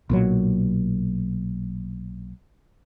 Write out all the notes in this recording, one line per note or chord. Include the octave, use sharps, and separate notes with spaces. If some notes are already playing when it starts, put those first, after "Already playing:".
B1 A#2 F#3